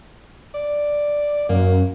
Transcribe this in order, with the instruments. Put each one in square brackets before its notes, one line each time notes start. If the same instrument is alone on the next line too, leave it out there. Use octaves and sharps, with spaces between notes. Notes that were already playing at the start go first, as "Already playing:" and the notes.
[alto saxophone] D5
[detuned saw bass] F#2 [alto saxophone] A#3